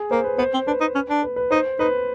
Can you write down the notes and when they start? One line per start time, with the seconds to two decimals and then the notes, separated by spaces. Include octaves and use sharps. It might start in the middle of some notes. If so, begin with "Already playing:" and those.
Already playing: G#4
0.11 A#3 C5
0.24 B4
0.38 B3 C5
0.53 C4
0.67 D4 B4
0.80 D#4
0.95 C#4
1.09 D4
1.22 B4
1.36 B4
1.51 D#4 C5
1.79 D#4 B4